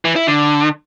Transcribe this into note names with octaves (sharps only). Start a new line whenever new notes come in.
E3
E4
D3